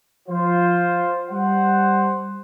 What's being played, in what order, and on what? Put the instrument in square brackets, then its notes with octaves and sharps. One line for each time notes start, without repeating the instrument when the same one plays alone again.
[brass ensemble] F3 F4 C5
G3 C5 F#5